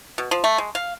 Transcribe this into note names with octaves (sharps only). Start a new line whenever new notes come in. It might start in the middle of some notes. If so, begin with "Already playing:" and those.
B2
F3
A3
G#3
F5